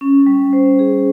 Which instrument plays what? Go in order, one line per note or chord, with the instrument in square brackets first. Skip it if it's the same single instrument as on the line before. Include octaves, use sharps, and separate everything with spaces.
[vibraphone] C#4
G3
C5
G#4